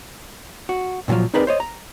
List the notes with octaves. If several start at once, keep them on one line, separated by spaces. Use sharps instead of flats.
F#4
A#2 C#3 F3 F#3 F4
C4 D#4 G#4 A#4 B4 D5
C5 C#5 D#5
A#5